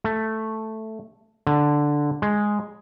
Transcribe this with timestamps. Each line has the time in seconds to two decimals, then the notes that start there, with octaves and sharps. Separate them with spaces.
0.04 A3
1.47 D3
2.22 G#3